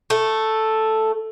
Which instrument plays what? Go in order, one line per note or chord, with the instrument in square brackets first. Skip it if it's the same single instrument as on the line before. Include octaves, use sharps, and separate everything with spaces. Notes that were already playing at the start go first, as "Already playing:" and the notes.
[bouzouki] A3